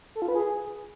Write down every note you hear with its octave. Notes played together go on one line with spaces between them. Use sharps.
A4
F4
B4
G#4